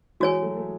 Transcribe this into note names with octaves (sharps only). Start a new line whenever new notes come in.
E3 G#3 F#4 C#5 G#5
F#3 A3
A3